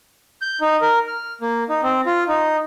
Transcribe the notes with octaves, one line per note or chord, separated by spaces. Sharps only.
G6
D#4
A#4
F6
A#3
D#4
C4
F4
D#4